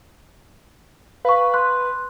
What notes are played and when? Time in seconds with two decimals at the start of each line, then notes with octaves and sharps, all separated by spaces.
1.25 B4 F5 C#6
1.54 C6 F#6